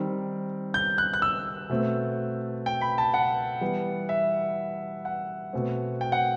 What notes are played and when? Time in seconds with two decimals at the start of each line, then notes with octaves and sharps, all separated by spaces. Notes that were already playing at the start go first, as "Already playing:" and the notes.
Already playing: D#3 G3 C4
0.74 G6
0.98 F#6
1.13 F#6
1.22 E6
1.70 B2 A3 C4
2.66 G5
2.81 B5
2.98 A5
3.14 F#5
3.61 E3 G3 B3
4.09 E5
5.05 F#5
5.53 B2 A3 C4
6.01 G5
6.12 F#5